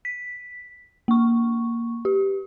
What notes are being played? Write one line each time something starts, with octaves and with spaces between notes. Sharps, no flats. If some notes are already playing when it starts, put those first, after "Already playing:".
B6
A#3 C#6
G4